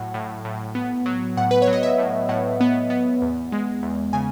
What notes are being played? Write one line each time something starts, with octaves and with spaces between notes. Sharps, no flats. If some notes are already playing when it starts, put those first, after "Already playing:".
Already playing: A2 F#3 F#5
A2
A2
B3
F#3
A2 F#5
B4
C#5
F#3
D#5
E5
A2
A2 F#5
B3
B3
E2
G#3
E2
C#3 G#5